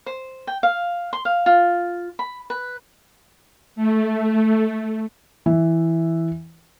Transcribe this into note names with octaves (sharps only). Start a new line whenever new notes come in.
C5
G5
F5
C6
F5
F4
B5
B4
A3
E3 E5